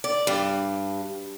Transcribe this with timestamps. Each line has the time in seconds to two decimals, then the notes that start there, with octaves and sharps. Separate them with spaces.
0.04 D5
0.27 G2